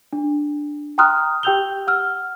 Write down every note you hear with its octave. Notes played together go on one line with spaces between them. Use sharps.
D4
G5 A#5 C6 D#6 F6 F#6
G4 G5 E6 G6 F7 G7
F#5 E6 F6